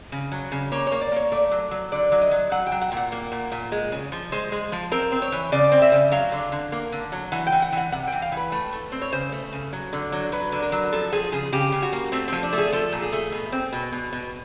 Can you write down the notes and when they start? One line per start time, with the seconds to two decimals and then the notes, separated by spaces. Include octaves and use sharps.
0.12 C#3
0.32 F#3
0.52 C#3
0.72 A#3 C#5
0.87 A#3 C#5
1.01 D5
1.12 A#3 C#5
1.32 A3 D5
1.51 F#3
1.71 F#3
1.92 D3 D5
2.12 F#3
2.21 D#5
2.31 F#3
2.52 F#3 F#5
2.67 G5
2.72 F#3
2.82 F#5
2.92 A#2
2.97 F#5
3.12 A#3
3.32 A#2
3.52 A#2
3.72 G#3
3.92 C#3
4.12 F3
4.32 G#3 C5
4.52 G#3
4.72 F3
4.92 C4 A#4
5.12 C4
5.22 C#5
5.32 E3
5.52 C#3 D5
5.72 C4
5.82 E5
5.92 C#3
6.12 F#3 F5
6.32 D3
6.52 D3
6.72 A#3
6.92 D3
7.12 F#3
7.32 E3 F#5
7.47 G5
7.52 E3
7.62 F#5
7.72 E3 F#5
7.92 C3 F#5
8.07 E3 G5
8.22 F5
8.32 E3
8.37 B4
8.52 A3
8.72 A3
8.92 C4
9.02 C#5
9.12 C#3 C5
9.32 A3
9.53 C#3
9.73 F#3
9.93 D3
10.12 F#3
10.32 F#3 B4
10.52 D3
10.62 A#4
10.72 F#3
10.92 F3 A4
11.12 F3 G#4
11.32 C#3 G#4
11.53 C#3 G4
11.72 C#3
11.82 F#4
11.93 A#3
12.12 A3 C4
12.28 F3 C4
12.43 D4
12.53 A3
12.58 G#4
12.73 F3 A4
12.92 A#2
13.02 G#4
13.13 A3
13.32 B2
13.52 C4
13.73 B2
13.93 B2
14.13 B2